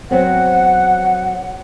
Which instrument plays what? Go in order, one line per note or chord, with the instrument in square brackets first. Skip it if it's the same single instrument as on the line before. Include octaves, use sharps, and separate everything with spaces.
[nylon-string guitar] F#3 B3 C4 [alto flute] F#5